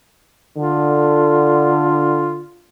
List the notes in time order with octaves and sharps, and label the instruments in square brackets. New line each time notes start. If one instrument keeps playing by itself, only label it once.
[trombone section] D3 [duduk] F4